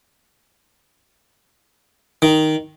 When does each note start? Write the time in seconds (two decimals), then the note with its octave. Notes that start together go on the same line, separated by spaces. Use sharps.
2.22 D#3